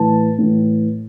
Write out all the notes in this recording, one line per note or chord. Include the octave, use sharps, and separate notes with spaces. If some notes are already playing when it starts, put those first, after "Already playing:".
Already playing: A2 E3 A5
A2 E3